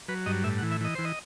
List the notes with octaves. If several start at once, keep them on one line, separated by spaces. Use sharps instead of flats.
F#3 B4
G2 D#5
A2 E5
F#5
E3
E5
E3 D#5
E3 C5
D#5